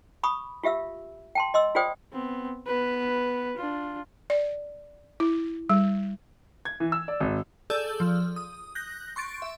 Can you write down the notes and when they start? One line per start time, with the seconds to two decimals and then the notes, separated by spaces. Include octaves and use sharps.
0.23 B5 C#6 D#6
0.63 F4 G4 E5 F5 E6
1.35 G5 A5 C6
1.54 D#5 C6 E6
1.75 F4 G#4 C5 D5 G5 D#6
2.12 B3 C4
2.67 B3 B4
3.57 D4 F4
4.30 D5
5.20 E4
5.70 G3
6.65 G#6
6.80 E3
6.92 E6
7.08 D5
7.20 G#1
7.70 G#4 A4 D5 E6 G6
8.00 F3
8.36 D#6
8.75 F#6 G6 A#6
9.16 C6 C#6 A6 D7
9.42 E5